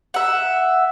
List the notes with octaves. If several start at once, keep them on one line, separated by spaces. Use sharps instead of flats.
E5 F#5